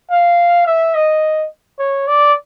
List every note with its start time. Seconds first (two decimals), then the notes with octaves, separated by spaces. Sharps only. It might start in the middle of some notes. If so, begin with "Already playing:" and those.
0.10 F5
0.66 E5
0.95 D#5
1.79 C#5
2.08 D5